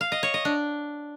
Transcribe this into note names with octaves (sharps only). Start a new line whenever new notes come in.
F5
D#5
C#5
D#5
D4